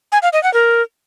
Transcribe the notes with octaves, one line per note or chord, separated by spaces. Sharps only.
G#5
F5
D#5
F#5
A#4